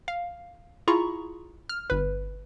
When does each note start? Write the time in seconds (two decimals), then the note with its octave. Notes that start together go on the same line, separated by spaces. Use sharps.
0.08 F5
0.88 E4 F4 G#4 A#5 B5 C#6
1.69 F6
1.90 G1 B4